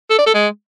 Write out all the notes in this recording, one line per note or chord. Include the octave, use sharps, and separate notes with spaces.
A4
D5
A4
G#3